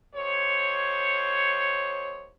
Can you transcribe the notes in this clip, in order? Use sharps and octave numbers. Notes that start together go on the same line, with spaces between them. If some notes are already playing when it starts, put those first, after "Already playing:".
D#2 C5 C#5